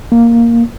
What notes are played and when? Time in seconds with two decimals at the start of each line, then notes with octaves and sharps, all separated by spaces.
0.12 A#3